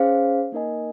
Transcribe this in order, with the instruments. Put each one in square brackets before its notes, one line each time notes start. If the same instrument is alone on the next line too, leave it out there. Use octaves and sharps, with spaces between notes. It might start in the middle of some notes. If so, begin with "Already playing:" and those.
Already playing: [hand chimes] C#4 G#4 C5 F5
A#3 D#4 A#4 D#5 G#5